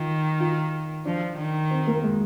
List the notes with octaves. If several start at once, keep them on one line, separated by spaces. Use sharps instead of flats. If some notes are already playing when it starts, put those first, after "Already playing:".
Already playing: D#3 F4
F4
F3 D4
D#3
C4
A#3
G#3